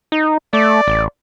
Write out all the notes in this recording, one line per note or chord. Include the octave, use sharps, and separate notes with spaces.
D#4
A3 D5
A1